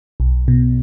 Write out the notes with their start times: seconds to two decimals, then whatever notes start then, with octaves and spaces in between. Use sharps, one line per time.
0.20 B1
0.48 B2